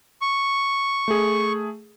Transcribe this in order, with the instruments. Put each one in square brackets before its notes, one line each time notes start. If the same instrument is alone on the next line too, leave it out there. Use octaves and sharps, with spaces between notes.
[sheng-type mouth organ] C#6
[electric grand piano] A3 G#4